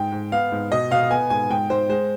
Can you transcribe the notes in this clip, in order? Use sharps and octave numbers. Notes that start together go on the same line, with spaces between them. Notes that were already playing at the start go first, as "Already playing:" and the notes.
Already playing: G#2 G5
G#2
B3 F5
G#2
B2 D#5
B2 F5
B3 G#5
G#2 G#5
G#2 G5
G#2 C5
G#3 C5